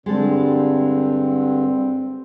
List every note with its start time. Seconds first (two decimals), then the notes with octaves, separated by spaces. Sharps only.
0.06 G2 D3 G#3 C4 G4 A4